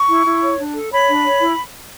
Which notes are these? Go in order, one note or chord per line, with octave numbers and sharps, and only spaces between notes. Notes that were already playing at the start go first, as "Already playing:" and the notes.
Already playing: C#6
E4
E4
C#5
D4
A4
C#5 B5
D4
C#5
E4